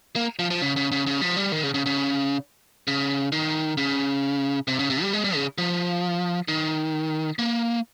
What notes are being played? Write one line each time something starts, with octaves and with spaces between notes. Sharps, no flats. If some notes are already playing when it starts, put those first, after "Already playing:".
A#3
F3
F3
C#3
C#3
C#3
C#3
F3
G3
D#3
C#3
C#3
C#3
C#3
D#3
C#3
C3
C#3
C3
G3
G#3
G3
C#3
F3
D#3
A#3